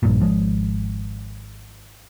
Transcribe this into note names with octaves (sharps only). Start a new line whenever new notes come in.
A#1 G2 A#2
G#1 F3 G#3